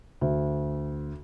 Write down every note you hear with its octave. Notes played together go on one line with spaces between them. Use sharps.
D2